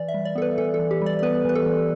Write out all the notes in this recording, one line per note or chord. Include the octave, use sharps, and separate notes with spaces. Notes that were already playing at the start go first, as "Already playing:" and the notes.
Already playing: E3 D5
E5
G3
D5
B3 A4
B4
E3 A4
A4
E3
G4
G3 D5
D5
B3 B4
E3 B4
A4
E3